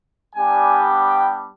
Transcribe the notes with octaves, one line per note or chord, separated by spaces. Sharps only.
G3 B3 D4 G4 G#5
G5